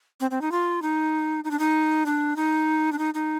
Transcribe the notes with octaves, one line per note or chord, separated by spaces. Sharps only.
C4
C4
D#4
F4
D#4
D#4
D4
D#4
D4
D#4
D4
D#4
D#4